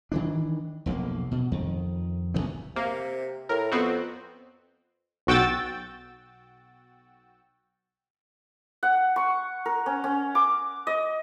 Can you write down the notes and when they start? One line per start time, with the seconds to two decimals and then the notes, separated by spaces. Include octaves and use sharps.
0.12 D#3 E3 D4
0.86 F1 B1 G#2 A#3
1.31 B2
1.52 F2 D#3
2.34 A1 D2 D3 B3
2.76 C3 A#3
3.49 A2 A#4
3.72 F2 B3 C4 F#4
5.27 B1 F#4 G5 E6 A6
8.83 F#5
9.16 C#6
9.66 A#4
9.86 C#4
10.04 C#4
10.35 D6
10.87 D#5